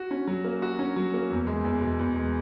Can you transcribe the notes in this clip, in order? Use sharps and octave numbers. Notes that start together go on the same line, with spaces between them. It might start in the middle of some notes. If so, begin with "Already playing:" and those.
Already playing: F#4
C#4
F#3
A#3
F#4
C#4
F#3
A#3
E2
G#3
E2
B2
E2
G#3